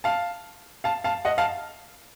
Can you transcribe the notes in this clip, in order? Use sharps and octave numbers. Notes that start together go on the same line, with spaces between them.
F5 A5
F5 A5
F5 A5
D#5 F#5
F5 A5